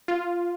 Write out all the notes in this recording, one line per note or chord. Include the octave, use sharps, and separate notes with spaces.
F4